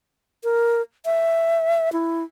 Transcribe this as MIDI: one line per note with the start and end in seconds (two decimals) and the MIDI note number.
0.44 0.82 70
1.05 1.92 76
1.93 2.24 64